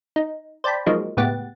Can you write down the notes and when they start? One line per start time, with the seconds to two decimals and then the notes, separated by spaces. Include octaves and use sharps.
0.16 D#4
0.64 C5 D5 G5 A5 B5
0.86 F3 F#3 G#3 A#3 D#4
1.17 C#2 A2 B3 G4 F#5 A6